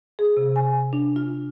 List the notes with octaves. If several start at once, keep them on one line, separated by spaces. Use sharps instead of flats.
G#4
C3
G#5
D4
F4